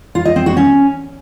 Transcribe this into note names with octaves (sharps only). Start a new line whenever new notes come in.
F4
D#5
C4
F#4
C#4